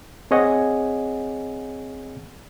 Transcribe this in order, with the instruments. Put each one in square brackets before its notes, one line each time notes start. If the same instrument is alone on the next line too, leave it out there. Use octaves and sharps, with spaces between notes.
[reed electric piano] C4 G#4 C#5 D#5 F#5 G#5